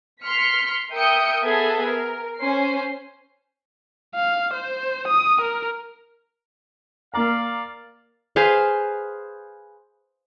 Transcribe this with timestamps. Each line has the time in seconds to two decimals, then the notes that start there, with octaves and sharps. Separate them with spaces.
0.24 C6 F6 B6 C#7
0.93 A#4 E5 G5 D#6 G6 C#7
1.44 B3 G#4 A4 E5 G#6
1.87 A#4
2.39 C#4 C5 C7
4.15 F5
4.53 C5
5.08 D#6
5.41 A#4
7.14 A#3 D5 F5 A#5
8.36 G#4 B4 C5 F5